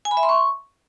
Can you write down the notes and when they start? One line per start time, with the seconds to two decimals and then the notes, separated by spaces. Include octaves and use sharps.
0.05 G#5
0.11 B5
0.17 E5
0.23 C6
0.29 C#6